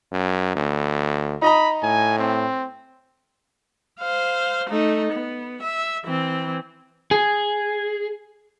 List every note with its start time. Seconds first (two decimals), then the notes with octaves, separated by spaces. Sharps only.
0.12 F#2
0.55 D2
1.42 D#4 D#5 A#5 B5
1.83 A2 G#5
2.19 C4
4.00 C5 F5
4.69 A3 D#4
5.12 B3
5.62 E5
6.05 E3 C4
7.11 G#4